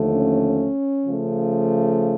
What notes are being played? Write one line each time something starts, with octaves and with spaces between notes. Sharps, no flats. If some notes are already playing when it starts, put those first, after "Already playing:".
Already playing: D#2 D3 F3 A3
C#4
C#3 F3 A3